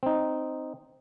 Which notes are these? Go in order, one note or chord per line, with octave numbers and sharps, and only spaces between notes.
C4 D#4